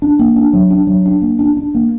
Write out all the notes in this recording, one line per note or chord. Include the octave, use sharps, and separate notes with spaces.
D4
A#3
D4
F#3
D4
F#3
D4
A#3
D4
D4
A#3